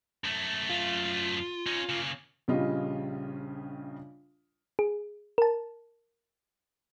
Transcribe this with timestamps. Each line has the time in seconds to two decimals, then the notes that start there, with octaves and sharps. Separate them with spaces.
0.24 F#2 A3
0.70 F4
1.66 C#4 D#4
1.89 C#3 A#3
2.48 A#1 C#3 G3 F4 D#5
4.79 G#4
5.38 A#4 A5